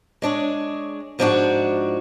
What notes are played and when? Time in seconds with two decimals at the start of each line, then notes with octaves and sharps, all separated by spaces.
0.22 G#3 D4 G#4 C#5
1.19 G#2 F3 G#3 D4 F#4